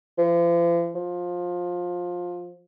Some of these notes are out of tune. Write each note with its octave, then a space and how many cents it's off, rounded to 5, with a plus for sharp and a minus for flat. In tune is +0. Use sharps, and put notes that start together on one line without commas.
F3 -40
F3 +20